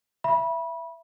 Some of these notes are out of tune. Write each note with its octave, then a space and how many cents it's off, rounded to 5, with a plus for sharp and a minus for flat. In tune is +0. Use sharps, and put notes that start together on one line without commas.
E5 +20 B5 -25